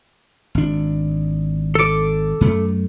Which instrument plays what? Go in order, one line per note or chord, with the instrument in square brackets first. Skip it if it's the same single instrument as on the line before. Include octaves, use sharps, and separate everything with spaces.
[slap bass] G#1 D4
[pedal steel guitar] A4 D6
[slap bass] F#2 A3